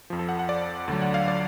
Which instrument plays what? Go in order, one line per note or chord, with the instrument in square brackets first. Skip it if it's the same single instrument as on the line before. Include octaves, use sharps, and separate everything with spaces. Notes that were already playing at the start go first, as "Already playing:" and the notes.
[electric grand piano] F2 F3
A4
F#5
F#5
D5
D2 D3 F#3
F#5
F5
D5